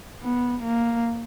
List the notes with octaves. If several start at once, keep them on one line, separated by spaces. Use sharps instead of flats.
B3
A#3